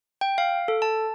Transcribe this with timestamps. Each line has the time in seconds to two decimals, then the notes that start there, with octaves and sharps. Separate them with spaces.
0.21 G5
0.38 F5
0.68 A4
0.82 A5